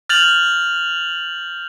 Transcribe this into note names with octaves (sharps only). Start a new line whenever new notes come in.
F6 G6 A6 F7 F#7